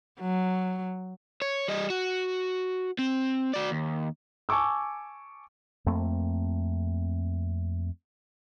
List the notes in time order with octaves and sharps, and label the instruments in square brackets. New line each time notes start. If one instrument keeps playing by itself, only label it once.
[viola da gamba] F#3
[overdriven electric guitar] C#5
G3 D#5
F#4
C4
F#4 D5
D#2
[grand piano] G#5 A5 C#6 D6 E6
[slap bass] F2 A3 A#3 C4